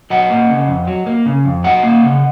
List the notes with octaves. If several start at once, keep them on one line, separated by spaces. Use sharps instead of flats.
F#3 D#5 F#5
A#3
C#3
F2
F#3
A#3
C#3
F2
F#3 D#5 F#5
A#3
C#3